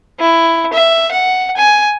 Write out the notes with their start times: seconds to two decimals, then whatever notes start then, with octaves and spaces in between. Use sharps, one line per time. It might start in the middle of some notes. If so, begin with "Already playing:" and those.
0.19 E4
0.73 E5
1.12 F#5
1.57 G#5